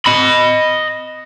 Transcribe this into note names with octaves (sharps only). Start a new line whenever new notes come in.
D#5 B5